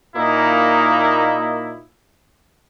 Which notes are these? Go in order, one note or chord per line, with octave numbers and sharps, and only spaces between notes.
A#2 A#3 D#4 E4 D#5